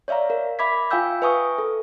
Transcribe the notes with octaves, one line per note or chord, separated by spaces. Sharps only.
C#5 D5 E5 F5 A#5
A#4
E5 B5 D6 G#6 B6
F4 F5 G5 G#5 E6 G6
B4 E5 G#5 C#6 D#6
A4